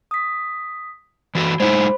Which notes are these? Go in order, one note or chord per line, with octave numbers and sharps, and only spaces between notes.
D#6 B6
E3 F#4 A4 B5
G#3 D#4 E4 C5 B5